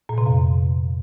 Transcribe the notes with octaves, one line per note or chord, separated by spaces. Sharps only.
A#2
C3
F2